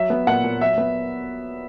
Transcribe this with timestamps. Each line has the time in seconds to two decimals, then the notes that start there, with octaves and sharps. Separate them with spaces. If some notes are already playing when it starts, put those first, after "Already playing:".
Already playing: F#3 E5
0.10 B3
0.27 A#2 F#5
0.44 A#2
0.61 F#3 E5
0.78 B3